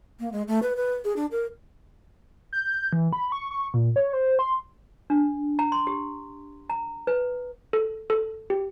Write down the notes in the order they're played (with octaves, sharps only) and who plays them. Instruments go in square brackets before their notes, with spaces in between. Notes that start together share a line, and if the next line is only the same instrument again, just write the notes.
[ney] A#3
G#3
A3
B4
B4
G#4
D4
A#4
[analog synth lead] G6
G6
E3
B5
C#6
C#6
A#2
C#5
C5
C6
[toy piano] D4
A#5
C6
G4
A#5
B4
[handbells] A4
A4
G4